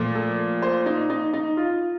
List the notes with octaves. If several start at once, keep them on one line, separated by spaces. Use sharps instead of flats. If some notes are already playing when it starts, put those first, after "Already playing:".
Already playing: A#2 F3 A3
A4
C5
D#4
D#4
D#4
F4